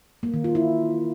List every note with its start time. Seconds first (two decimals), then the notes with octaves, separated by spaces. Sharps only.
0.23 A#3
0.34 D#3
0.44 F4
0.55 E4